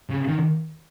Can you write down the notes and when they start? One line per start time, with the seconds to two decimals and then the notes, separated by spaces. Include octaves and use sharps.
0.11 C#3
0.28 D#3